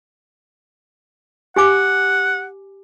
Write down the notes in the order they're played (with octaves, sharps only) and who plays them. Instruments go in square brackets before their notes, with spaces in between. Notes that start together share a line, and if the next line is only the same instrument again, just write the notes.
[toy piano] G4 G#5 D6 [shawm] F#5